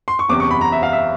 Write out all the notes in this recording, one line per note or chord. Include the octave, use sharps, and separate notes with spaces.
C6
C#6
F#1 E2 C3 D6
C#6
B5
A#5
E5
F5
E5